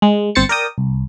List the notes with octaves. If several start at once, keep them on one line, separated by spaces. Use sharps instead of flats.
G#3
G1 C4 C5 A6 C#7
A#4 D5 G5 D#6
C2